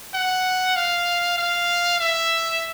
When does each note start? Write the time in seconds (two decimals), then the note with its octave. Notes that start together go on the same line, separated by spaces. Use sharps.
0.14 F#5
0.76 F5
1.38 F5
2.00 E5